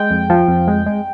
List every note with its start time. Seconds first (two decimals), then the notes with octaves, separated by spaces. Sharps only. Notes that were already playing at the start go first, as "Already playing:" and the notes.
Already playing: G#3 G5
0.11 F2
0.30 F3
0.48 F2
0.68 G#3
0.86 G#3